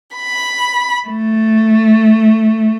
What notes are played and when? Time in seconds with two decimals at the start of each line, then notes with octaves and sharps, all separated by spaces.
0.16 B5
1.07 A3